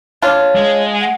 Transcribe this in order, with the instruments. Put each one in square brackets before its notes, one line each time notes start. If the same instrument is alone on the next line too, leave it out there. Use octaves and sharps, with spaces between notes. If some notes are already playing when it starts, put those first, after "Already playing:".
[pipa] D4 F4 [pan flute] C#5
[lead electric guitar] G#3
[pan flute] F#5